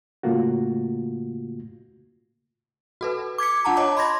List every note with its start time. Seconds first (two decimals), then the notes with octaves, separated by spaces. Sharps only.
0.23 A2 C#3 A3 A#3 F4 F#4
3.01 F#4 A4 B4
3.38 D6 G#6 B6 C#7
3.65 D4 F4 F#5 A5 A#5
3.76 C#5 D#5 A5 D6
3.97 B5 C6 G#6 A#6